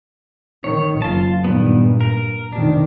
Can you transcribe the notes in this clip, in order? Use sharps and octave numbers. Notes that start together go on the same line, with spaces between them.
D#3 C#5
F#1 F4 A5
G2 A#2 D#3 G3 B3
A#4
F1 B2 D#3 D4